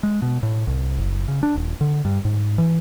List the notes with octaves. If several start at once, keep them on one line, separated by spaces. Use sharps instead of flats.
G#3
B2
A2
C2
F#1
C#3
D4
D#1
D3
G2
G#2
E3